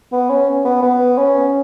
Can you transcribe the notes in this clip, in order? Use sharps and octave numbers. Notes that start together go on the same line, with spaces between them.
B3
C#4
B3
B3
C#4